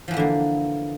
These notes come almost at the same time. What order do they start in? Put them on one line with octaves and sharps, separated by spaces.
F3 E3 B3 D3 A#3